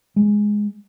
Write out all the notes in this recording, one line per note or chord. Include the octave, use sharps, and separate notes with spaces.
G#3